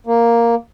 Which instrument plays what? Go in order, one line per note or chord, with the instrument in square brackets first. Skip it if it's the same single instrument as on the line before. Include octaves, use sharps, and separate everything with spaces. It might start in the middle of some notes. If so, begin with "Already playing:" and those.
[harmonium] A#3